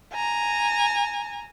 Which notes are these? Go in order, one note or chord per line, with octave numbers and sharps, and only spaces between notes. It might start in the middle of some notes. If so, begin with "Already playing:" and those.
G#5 A#5